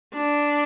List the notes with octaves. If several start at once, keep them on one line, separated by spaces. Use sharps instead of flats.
D4